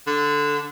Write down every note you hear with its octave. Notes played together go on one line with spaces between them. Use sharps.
D3